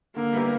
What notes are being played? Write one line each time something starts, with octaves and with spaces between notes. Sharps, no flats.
D3 A#3
G3 B3 E4 G4